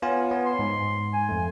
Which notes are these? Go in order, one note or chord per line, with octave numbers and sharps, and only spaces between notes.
B3 F4 C#5 G#5
B3
C6
G#2
G#5
F2 A3